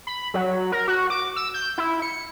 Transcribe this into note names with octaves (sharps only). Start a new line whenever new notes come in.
B5
F#3
A#4
F#4
D6
E6
G6
E4
C#7